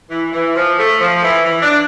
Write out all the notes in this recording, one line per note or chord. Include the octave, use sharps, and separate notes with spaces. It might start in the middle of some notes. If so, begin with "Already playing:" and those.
E3
E3
F3
A3
F3
E3
E3
D4